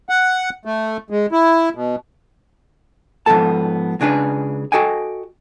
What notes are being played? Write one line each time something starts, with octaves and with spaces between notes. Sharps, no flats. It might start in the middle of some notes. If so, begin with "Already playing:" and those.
F#5
A3
G#3
E4
B2
G#2 F3 F#3 B3 A4 A5
C#2 C#3 D4 G#4 B4
F#4 A4 D#5 G5 G#5